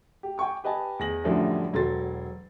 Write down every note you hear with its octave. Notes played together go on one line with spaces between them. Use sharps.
G4
G5 G#5 C#6 D6
G4 B4 D#5 G#5 A5
E2 G#4 A#6 F#7
F#2 A2 D3 E3 F3 G3
E1 F#3 A4 C6 A6